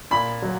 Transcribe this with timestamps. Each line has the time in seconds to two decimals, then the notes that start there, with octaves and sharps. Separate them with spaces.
0.11 A#2 B5
0.42 F#3